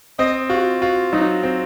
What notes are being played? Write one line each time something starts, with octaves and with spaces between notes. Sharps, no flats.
C4 D#5
F4 F#4
F4 F#4
F#3 D#4
C4